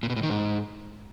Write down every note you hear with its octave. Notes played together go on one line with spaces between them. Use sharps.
A#2
B2
A2
D#3
G#2